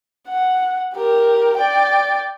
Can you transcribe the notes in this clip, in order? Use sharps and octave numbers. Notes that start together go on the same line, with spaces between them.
F#5
G4 A#4
D5 G5